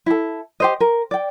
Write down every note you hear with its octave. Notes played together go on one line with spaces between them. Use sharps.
E4 A4
G4 C5 D#5
A#4
D5 G5